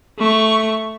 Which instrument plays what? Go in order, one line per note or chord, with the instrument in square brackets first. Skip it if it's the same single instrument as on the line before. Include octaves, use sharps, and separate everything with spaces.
[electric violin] A3 C#6